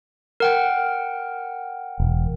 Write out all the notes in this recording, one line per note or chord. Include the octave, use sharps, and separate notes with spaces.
A#4 F#5 G5
E1